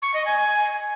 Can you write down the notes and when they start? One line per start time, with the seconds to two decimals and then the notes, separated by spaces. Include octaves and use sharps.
0.02 C#6
0.14 D#5
0.25 G#5